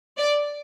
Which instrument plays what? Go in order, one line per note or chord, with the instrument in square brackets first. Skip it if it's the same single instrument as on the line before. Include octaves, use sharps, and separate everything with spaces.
[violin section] D5